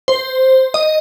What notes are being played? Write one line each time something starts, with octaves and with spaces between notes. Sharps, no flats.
C5
D#5